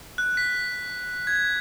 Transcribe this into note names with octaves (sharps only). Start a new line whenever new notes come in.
F#6
B6
G#6